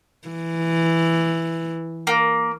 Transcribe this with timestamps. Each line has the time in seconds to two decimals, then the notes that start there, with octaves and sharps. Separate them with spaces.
0.28 E3
2.07 A#3